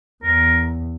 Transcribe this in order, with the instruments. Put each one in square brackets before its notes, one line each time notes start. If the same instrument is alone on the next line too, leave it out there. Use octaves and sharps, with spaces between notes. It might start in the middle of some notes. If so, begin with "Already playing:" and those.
[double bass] E2 [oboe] A#4